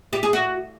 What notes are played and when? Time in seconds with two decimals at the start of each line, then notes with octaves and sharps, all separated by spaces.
0.13 G4
0.23 G#4
0.33 F#4